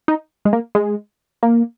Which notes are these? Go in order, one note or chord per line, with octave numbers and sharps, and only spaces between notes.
D#4
G#3
A#3
G#3
A#3